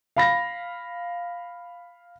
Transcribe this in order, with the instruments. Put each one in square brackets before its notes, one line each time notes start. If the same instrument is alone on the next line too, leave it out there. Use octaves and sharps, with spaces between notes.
[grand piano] F5 B5 A#6